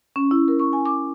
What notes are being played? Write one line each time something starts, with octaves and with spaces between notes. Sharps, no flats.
C#4
E4
A#4
C#6
G#5
D6